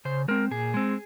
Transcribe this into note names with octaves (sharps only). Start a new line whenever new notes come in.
C#3 C5
G#3 C4 A#4
A#2 G#4
G#3 C4